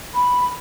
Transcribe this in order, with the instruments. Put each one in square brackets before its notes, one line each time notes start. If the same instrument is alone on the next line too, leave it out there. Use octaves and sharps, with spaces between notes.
[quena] B5